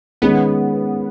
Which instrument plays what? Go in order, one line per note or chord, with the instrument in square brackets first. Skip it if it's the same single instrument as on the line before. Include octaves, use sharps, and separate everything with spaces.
[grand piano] D#3 G#3 C#4 G#4 [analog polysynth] B3